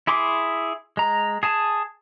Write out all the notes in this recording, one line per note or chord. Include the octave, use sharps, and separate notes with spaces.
E4 G#4 C6 D6
G#3 A#5
G#4 G#5 A5